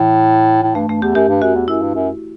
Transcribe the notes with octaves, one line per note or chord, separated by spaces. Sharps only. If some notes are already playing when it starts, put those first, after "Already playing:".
Already playing: A2 E3
A2
G2 A3
G2 A3
E2 G4
F#2 G4
G2
F#2 F#4
E2
F#2 E4
G2
F#2